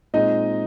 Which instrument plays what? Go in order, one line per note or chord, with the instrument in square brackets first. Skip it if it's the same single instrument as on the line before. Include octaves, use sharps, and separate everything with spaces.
[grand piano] A#2 G#3 C4 D#4 D#5